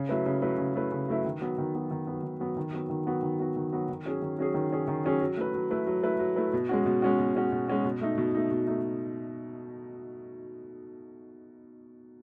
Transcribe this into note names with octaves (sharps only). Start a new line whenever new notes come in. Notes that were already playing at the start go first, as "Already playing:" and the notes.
Already playing: C#3
F#3 A3 E4 B4
C#3
F#3 A3 E4 B4
C#3
F#3 A3 E4 B4
C#3
F#3 A3 E4 B4
D#3
F#3 B3
D#3
F#3 B3
D#3
F#3 B3
D#3
F#3 B3
D#3
F#3 B3 F#4
D#3
F#3 B3 F#4
D#3
F#3 B3 F#4
D#3
F#3 B3 F#4
D#3
F#3 C#4 G#4
D#3
F#3 C#4 G#4
D#3
F#3 C#4 G#4
D#3
F#3 C#4 G#4
F#3
A3 E4 B4
F#3
A3 E4 B4
F#3
A3 E4 B4
F#3
A3 E4 B4
B2
G#3 C#4 F#4
B2
G#3 C#4 F#4
B2
G#3 C#4 F#4
B2
G#3 C#4 F#4
B2
A3 D#4
B2
A3 D#4
B2
A3 D#4